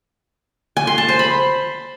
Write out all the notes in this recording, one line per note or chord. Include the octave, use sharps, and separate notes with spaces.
G#5
C6
A5
C5
B5